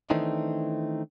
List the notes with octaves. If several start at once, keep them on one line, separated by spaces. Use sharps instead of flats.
D#3 E3 A3 C4 D4 D#4